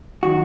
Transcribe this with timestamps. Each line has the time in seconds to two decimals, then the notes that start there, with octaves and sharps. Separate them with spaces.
0.23 D#3 F#3 F#4